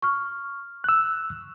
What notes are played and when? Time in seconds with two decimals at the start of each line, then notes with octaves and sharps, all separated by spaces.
0.02 C#6 F6
0.84 E6 F#6